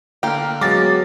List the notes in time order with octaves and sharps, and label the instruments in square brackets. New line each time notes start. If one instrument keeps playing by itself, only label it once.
[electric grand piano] D3 F6 [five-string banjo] A#3 G5
[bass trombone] F#3 [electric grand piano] G#3 B3 [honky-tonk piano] D6 A6